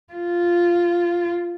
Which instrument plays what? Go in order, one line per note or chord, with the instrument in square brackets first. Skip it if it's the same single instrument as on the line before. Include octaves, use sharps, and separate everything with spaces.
[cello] F4